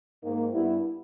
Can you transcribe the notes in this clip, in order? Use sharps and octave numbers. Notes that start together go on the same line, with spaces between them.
G#2 D#3 A#3
G2 G3 B3 E4